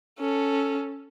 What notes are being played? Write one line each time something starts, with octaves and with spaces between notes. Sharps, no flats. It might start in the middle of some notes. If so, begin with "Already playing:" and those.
C#4 A4